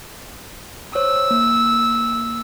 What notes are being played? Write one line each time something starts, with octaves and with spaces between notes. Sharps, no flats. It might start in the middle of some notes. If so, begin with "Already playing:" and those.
C5 C#5 E6
A#3